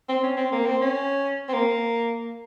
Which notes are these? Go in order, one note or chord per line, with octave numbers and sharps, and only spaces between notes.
C4
C#4
C4
A#3
C4
C#4
C4
A#3